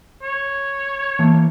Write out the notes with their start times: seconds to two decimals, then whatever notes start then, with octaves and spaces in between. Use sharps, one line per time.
0.22 C#5
1.19 E3 A#3 A5